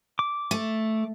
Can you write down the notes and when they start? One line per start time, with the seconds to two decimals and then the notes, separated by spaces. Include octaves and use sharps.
0.19 D6
0.51 A3